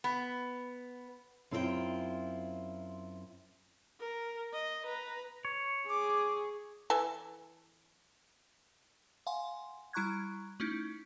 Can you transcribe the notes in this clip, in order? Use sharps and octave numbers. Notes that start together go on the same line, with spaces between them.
B3
F#2 C4 E4 F4 A#4 G5
A#4
D#5
B4 A#5
C#5
G#4 D6
E3 A4 G#5
F5 F#5 G#5 C6
G3 E4 A#5 C#6 F#6 G#6
A3 C#4 D#4 E4